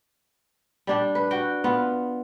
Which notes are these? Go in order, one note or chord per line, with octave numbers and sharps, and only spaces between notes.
G3 D4 G4
B4
F#4 G5
B3 F4